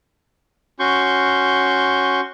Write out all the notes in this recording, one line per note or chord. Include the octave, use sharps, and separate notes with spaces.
C#4 F#4 C6 C#6 G6